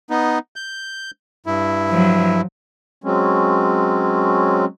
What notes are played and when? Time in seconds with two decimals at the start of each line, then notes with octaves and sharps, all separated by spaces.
0.10 B3 D#4
0.56 G6
1.46 G2 E4
1.90 F3 F#3
3.04 F#3 G#3 C4 C#4